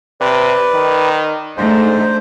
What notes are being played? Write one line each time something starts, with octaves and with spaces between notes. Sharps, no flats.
C3 B4 D5
D#3
G#2 A3 D4 D#4 C5